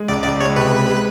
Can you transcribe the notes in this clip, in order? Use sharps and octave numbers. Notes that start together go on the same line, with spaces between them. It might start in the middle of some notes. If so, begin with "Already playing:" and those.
Already playing: G#3
C#2 D5
C#2 D5
G#3 C#5
C3 B4
G#3
G#3